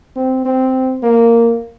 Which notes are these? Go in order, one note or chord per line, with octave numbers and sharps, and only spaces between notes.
C4
C4
A#3